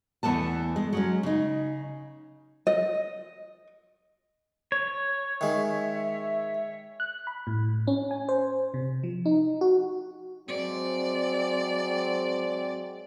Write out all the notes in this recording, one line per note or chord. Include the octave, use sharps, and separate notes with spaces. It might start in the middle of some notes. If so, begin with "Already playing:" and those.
E2 E3 A3 B3 B4 A5
G#3
F#3 G#3 C#4
C#3 D#4
D#5
C#5
D#3 G#3 E5
F#6
B5
A2
C#4
G#5
C5
C3
F3
D#4
F#4
F#3 G#3 C4 D5